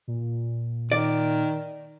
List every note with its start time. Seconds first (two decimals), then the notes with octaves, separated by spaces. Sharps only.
0.08 A#2
0.92 D#3 D5